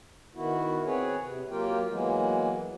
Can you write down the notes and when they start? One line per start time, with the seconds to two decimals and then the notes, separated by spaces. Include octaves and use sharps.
0.35 D#3 B3 E4 F#4
0.85 C4 G#4 B4 C#5
1.21 C3
1.50 F#3 A#3 F4 G4 A#4 G5
1.90 E3 F#3 G#3 A#3 B3